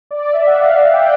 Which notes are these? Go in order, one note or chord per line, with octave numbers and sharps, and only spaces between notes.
D5
E5
F#5
F5
G5
F#5